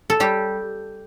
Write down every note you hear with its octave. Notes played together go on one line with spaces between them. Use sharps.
A4
G3 G4